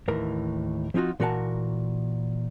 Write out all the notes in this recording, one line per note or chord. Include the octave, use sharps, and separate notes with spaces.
D#2 A2 E3 A#4 A#5
F3 C4 D#4 F4 F#4
A#2 E3 F#4 A#4 F#5 A5